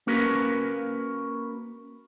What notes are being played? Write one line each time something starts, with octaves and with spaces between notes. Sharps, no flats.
A#3 C#4 F#4 A#4 B4